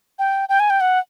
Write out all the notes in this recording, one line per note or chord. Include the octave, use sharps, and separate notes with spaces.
G5
G5
G#5
G5
F#5